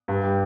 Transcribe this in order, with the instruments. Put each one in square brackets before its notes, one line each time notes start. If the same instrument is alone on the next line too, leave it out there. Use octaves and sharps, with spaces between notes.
[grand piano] G2
G3